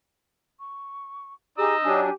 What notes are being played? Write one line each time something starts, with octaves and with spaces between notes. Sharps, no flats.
C#6
D#4 G4 G#4 D#5 A#5 E6
F#3 D4 G4 G#5